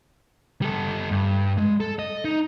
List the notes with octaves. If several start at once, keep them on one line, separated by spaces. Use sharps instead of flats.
G3 A4
G2
G#3
A4
D#5
D#4